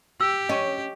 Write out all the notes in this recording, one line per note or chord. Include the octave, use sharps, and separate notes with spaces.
G4 E6
C#4 D#5 C#6